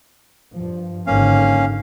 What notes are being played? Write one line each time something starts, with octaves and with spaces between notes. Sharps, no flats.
G2 F3
G#1 G#2 D3 A#3 C#4 F5